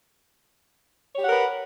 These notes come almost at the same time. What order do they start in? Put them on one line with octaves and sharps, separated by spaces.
C#5 G4 F#5 A#4 B4